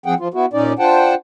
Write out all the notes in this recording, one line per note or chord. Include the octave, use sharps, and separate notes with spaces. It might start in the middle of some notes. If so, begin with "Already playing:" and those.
F3 C4 G#4 F#5 G5
F3 F4
B3 E4 F#4
A#2 C#4 D#4 D5
D4 F4 C5 F#5 G5 A5